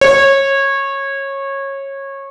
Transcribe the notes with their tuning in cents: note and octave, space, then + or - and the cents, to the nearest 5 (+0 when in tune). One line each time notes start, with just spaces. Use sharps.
C#5 -20